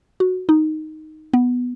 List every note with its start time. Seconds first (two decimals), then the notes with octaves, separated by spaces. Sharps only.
0.20 F#4
0.49 D#4
1.34 B3